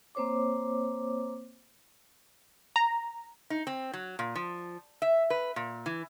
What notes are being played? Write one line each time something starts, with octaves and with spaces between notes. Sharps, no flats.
A#3 C4 C5 C#5 D6
A#5
D#4
C4
F#3
A#2
F3
E5
B4
A#2
E3